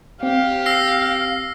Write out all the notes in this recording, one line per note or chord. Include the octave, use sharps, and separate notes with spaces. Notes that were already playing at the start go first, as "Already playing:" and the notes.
C4 G4 F5
E6 A#6 C7